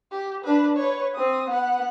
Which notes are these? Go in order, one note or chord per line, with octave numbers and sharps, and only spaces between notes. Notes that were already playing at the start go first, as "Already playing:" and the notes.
G4
D4 B4
B4 C#5
C4 D#6
B3 F#5